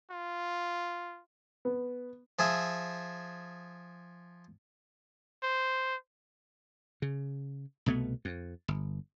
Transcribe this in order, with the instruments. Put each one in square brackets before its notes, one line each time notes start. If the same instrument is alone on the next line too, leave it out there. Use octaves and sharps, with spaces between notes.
[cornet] F4
[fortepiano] B3
[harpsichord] F3 G#4 E5
[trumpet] C5
[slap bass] C#3
C2 B2 A3 B3
F2
G1